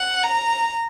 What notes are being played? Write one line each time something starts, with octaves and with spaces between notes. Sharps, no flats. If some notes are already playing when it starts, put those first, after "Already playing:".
Already playing: F#5
A#5